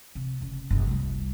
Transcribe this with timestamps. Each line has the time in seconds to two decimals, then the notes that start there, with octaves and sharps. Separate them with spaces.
0.15 C3
0.41 F1 C#3
0.70 F#1 B1
0.87 C2 G3